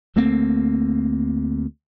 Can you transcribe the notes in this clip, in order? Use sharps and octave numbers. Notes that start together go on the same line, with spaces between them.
D2 A3 A#3 C4